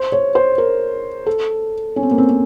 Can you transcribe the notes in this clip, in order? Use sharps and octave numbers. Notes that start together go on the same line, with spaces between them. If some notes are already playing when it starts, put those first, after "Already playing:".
Already playing: C5
C#5
C5
A#4
A4
C#4
C4
A#3
C4
C4